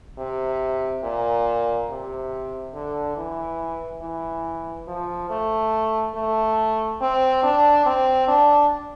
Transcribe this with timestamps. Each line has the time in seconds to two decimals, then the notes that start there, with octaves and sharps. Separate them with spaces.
0.18 C3
1.04 A#2
1.89 C3
2.74 D3
3.17 E3
4.02 E3
4.87 F3
5.30 A3
6.15 A3
7.01 C4
7.43 D4
7.86 C4
8.28 D4